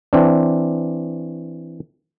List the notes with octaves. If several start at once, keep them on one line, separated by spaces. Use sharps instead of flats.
E3 C4 D4